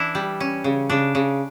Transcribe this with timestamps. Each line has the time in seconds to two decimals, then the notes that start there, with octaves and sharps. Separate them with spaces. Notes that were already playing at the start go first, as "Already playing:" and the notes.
Already playing: E3 D4 E4
0.15 G3
0.40 C#4
0.64 C#3
0.90 C#3 D4
1.15 C#3